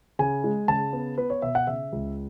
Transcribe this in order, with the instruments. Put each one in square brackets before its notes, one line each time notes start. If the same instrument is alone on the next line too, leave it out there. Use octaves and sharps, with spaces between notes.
[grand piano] C#3 G#5
G#3
C#3 A5
B3
B3 B4
C#5
B2 E5
F#5
C#3 E5
C#2